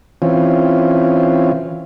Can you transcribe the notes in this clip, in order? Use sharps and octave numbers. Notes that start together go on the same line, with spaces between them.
E3 C4 C#4 F4